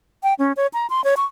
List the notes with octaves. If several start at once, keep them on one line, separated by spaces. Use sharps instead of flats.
G5
C#4
C#5
A#5
C6
C#5
C#6